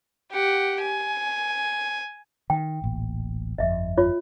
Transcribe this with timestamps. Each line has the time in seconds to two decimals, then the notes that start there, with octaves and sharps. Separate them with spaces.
0.31 G4 F#5
0.81 G#5
2.50 D#3 G5
2.82 D1 A1 A#2
3.58 G1 F2 D#5 E5
3.98 F4 C#5